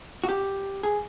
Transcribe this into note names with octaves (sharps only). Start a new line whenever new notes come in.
F#4
G4
G#4